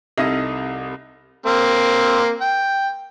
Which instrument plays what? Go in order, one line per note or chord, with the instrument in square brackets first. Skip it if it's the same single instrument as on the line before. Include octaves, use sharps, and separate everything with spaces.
[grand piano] C2 A4 D#6 [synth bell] C4 G4 [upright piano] D#4 E4 D#5
[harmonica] A#3 C4
G5